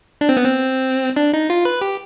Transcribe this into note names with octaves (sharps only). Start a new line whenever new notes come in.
D4
C4
B3
C4
D4
D#4
F4
B4
G4